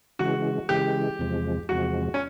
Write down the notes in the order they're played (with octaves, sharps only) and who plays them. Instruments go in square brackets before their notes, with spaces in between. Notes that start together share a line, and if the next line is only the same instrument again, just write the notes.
[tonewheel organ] C#3 E3 G#3 [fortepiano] F#4
[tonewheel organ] C#3 E3 G#3 [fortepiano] G4
[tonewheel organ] E2 C3 F3 G#3
[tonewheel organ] E2 C3 F3 G#3 [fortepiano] F#4
[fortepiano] C#4